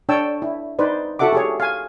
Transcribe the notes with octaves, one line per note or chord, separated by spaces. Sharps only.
D4 C#5 G5 A5 E6
E4
D#4 B4 C5 D5
E4 F#4 A4 E5 F#5 D6
G4 G#4 C#5
F5 G#5